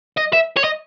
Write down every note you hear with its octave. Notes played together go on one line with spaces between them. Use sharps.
D#5
E5
C#5
D#5